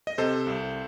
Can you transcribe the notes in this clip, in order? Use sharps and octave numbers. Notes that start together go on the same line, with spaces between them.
D#5
C3 A4 C5
C2